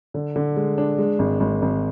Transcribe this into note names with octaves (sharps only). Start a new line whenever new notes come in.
D3
D3
G#3
D4
G#3
G#1
G#1
G#1